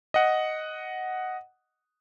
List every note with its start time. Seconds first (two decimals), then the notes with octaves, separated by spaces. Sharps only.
0.14 D#5 F#5